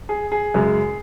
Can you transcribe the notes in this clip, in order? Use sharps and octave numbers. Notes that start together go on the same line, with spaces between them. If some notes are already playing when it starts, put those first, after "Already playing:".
G#4
G#4
F#2 C#3 G#3